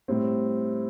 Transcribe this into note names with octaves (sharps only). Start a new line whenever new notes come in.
A2 G3 C4